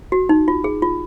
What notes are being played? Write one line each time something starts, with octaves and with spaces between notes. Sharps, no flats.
F#4
D#4
F4
G#4
F4